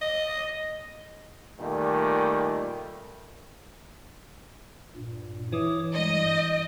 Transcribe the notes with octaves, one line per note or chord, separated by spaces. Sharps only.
D#5
A#2 D#3 G3 A3
G2 A#2
E3 C#5 D6 D#6
G2 G3 G#3 D#5
D#6 G6